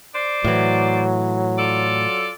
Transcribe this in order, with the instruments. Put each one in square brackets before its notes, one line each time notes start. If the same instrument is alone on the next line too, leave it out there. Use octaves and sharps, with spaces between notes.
[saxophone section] C5 D5
[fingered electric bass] A2 E3 [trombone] F#3
[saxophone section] F4 A4 D5